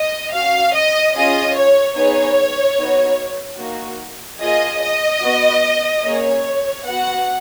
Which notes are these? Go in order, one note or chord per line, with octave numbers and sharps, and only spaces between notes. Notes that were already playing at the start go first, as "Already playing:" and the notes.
Already playing: D#5
C#4 F#4 F5
D#5
C#4 F4 G#4 D#5
C#5
B3 D#4 G#4 C#5
B3 D#4 F#4
A#3 D#4 F#4
A#3 F4 G#4 D#5
D#5
B3 F#4
A#3 C#4 G#4 C#5
B3 F#4 F#5